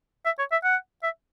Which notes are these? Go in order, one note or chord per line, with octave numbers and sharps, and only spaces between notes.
E5
C#5
E5
F#5
E5